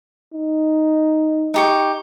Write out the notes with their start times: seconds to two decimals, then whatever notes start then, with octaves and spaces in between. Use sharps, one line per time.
0.34 D#4
1.54 D#4 G4 C#6